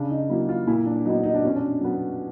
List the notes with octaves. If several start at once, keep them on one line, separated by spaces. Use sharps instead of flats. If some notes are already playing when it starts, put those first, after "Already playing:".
Already playing: C#3 D4
D#4
F#3 A#3 E4
F4
A#2 E4
D4
F#3 B3 D#4
D#4
D4
B2 C#4
D4
F#3 B3